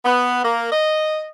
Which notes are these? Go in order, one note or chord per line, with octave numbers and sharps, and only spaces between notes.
B3
A#3
D#5